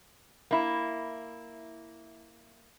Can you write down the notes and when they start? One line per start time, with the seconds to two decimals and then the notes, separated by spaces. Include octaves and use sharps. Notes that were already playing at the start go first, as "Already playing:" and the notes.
0.51 A#3 E4